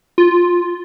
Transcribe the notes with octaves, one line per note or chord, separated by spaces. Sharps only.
F4